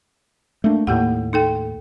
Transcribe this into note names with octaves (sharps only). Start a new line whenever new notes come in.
A3 A#3 D4
D#2 A2 A#3 G4 F#5
D#4 A4 G5